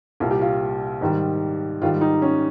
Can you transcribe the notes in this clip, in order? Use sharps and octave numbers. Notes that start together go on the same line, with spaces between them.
C2 A#2 G3 F4
G4
F4
G#2 D#3 G3
G#2 D#3 G3 F4
D#4
C#4